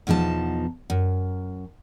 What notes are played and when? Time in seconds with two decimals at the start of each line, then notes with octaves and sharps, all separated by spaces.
0.07 E2 B2 F3 D#4 A5
0.90 F#2